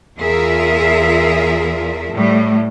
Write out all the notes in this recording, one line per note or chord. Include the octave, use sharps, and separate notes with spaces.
E2 F4 G#4 A#4 E5
A2 G3